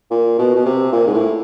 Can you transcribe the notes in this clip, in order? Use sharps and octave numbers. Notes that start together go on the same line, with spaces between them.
A#2
B2
B2
C3
A#2
G#2
A2